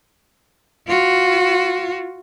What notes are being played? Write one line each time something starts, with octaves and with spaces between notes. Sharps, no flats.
F4 F#4